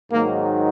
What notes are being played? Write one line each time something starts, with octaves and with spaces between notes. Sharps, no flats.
G#2 D#3 F#3 A#3